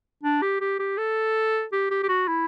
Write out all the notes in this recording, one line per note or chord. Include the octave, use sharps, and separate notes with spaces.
D4
G4
G4
G4
A4
G4
G4
G4
F#4
E4